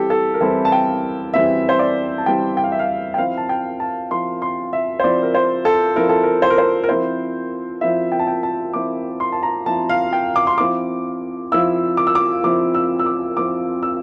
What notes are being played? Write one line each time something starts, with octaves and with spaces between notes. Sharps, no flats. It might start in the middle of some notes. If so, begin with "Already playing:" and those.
Already playing: E3 G3 C4 E4 G4 A4
A4
A#4
E3 G3 C4 E4 A4
A5
G5
E3 G3 C4 E4 E5
C5
D5
A5
E3 G3 C4 E4 G5
G5
F5
E5
F5
G5
F3 C4 E4 F5
A5
G5
A5
F3 C4 E4 C6
C6
E5
C5
F3 C4 E4 D5
A#4
C5
A4
F3 C4 E4 A#4
A4
A#4
C5
A#4
C5
A#4
F3 C4 E4 C5
F3 C4 E4 E5
G5
A5
G5
A5
F3 C4 E4 D6
C6
A5
A#5
F3 C4 E4 A5
F5
G5
D6
C6
F3 C4 E4 D6
F3 C4 E4 E6
D6
E6
D6
F3 C4 E4 D6
E6
E6
D6
F3 C4 E4 D6
E6